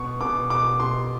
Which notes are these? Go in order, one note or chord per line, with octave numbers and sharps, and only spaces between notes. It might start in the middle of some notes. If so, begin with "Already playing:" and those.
Already playing: B2 C#6
B2 D6
B2 D6
B2 C6